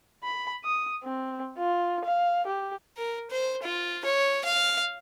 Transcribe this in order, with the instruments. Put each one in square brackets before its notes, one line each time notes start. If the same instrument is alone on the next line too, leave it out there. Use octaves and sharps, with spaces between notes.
[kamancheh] B5
D#6
C4
F4
F5
G4
[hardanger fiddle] A#4
C5
F4
C#5
F5